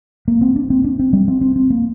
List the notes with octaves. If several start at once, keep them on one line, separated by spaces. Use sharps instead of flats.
A#3
C4
D4
C4
D4
C4
G3
C4
C4
C4
A#3